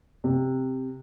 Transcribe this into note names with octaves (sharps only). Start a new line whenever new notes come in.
C3